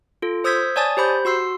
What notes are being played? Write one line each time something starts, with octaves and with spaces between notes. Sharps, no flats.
F4 A4
C5 D#6 E6 G6 G#6 B6
C#5 D5 G#5 A5 D#6 A6
G4 C5 B5 G6
F#4 C6 E6 C7